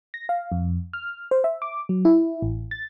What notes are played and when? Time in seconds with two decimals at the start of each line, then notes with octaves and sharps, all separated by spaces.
0.14 A#6
0.29 F5
0.52 F2
0.93 F6
1.31 C5
1.44 E5
1.62 D6
1.89 F#3
2.05 E4
2.42 A1
2.71 A6